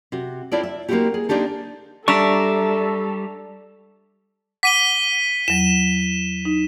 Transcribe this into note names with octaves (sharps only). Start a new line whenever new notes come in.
C3 F#4
C4 E4 F4 A4 C#5 D5
E5
A#3 C4 C#4 E4 F#4 G4
G#4
A#3 C4 D4 D#4 G4 A4
G3 D4 A4 E5 A#5 C#6
F#5 D6 B6 D#7 G7
E2 F#3 E7
D#4